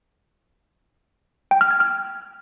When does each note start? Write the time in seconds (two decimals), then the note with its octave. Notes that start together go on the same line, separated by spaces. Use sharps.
1.51 G5
1.61 F6
1.71 G#6
1.80 F6